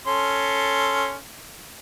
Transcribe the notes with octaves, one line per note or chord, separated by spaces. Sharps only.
C#4 A4 C6